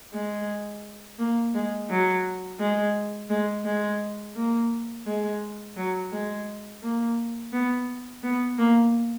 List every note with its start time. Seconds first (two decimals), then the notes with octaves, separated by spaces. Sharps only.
0.13 G#3
1.19 A#3
1.54 G#3
1.90 F#3
2.60 G#3
3.30 G#3
3.65 G#3
4.36 A#3
5.06 G#3
5.77 F#3
6.12 G#3
6.82 A#3
7.53 B3
8.23 B3
8.58 A#3